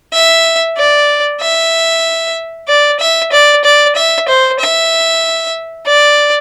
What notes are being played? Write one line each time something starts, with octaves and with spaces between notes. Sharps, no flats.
E5
D5
E5
D5
E5
D5
D5
E5
C5
E5
D5